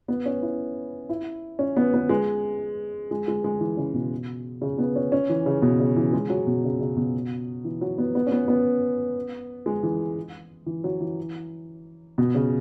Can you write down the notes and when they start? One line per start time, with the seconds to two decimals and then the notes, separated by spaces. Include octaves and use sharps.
0.08 B3
0.26 C#4
0.42 E4
1.09 E4
1.59 C#4
1.76 B3
1.94 B3
2.09 G#3
3.11 G#3
3.28 G#3
3.44 G#3
3.61 E3
3.77 C#3
3.94 B2
4.62 C#3
4.78 B3
4.96 C#4
5.12 C#4
5.29 E3
5.46 C#3
5.62 B2
5.80 C#3
5.96 E3
6.13 G#3
6.30 F#3
6.47 B2
6.64 C#3
6.81 C#3
6.97 B2
7.65 E3
7.81 F#3
7.98 B3
8.15 B3
8.27 C#4
8.32 B3
8.48 B3
9.66 G#3
9.83 E3
10.66 E3
10.84 F#3
11.01 E3
12.18 B2
12.35 C#3